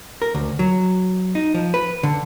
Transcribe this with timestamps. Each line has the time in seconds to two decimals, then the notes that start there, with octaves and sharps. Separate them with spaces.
0.22 A#4
0.35 D2
0.59 F#3
1.35 D#4
1.54 F3
1.74 B4
2.03 D3